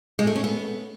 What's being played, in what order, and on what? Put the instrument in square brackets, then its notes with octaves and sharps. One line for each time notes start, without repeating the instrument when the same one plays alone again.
[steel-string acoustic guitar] G#3
A3
C#4
B3